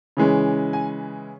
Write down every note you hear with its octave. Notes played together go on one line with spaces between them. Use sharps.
C#3 E3 G#3 C#4
G#5